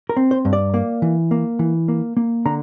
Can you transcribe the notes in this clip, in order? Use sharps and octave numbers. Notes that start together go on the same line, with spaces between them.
A#4
C4
C5
G2
D5
A#3
E3
A#3
E3
A#3
A#3
D3 A#5